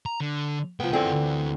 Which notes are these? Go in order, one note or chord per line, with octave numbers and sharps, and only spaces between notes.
A#5
D3
C2 F3 B3 G5
D3 E3 C4 G#4 F#5
D2